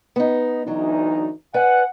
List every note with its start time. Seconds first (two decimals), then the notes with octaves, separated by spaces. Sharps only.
0.16 B3 D#4
0.67 D2 E3 F#3 D4 D#4
1.54 B4 D5 F#5 G#5